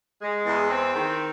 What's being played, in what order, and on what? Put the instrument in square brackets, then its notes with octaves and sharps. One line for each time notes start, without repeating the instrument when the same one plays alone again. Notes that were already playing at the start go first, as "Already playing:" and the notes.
[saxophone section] G#3
E2
C4
D#3